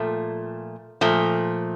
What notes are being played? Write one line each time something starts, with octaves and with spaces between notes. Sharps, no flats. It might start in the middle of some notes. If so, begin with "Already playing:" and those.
Already playing: A#2 F3 A3
A#2 F3 A3